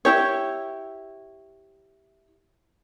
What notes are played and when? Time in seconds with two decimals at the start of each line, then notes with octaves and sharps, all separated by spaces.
0.05 E4 G4 C#5